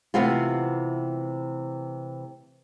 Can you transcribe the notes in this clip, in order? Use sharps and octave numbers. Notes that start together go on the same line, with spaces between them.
C3 E3 A3 B3 C4 F4